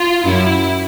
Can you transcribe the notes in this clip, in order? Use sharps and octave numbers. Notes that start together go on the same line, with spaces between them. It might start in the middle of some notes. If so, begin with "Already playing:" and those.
Already playing: F4
F#2 E4